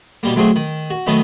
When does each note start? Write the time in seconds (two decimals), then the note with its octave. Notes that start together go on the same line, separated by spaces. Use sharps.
0.23 B2 G3 A#3
0.36 D2 F#3 A3 C4 G#4
0.56 D#3
0.90 F#4
1.07 D#3 F#3 A3 B3 D#4